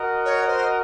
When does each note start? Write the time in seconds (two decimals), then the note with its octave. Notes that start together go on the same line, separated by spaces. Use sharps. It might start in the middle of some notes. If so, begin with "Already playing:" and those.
Already playing: F#4 A#4 D#5 F#5
0.25 C#5
0.47 C5